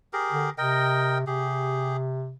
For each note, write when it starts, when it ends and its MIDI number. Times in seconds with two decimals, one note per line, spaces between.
0.13 0.50 67
0.13 0.50 68
0.13 0.50 70
0.32 0.48 50
0.58 1.26 48
0.58 1.18 70
0.58 1.18 75
0.58 1.18 79
1.27 2.35 48
1.27 1.97 67
1.27 1.97 68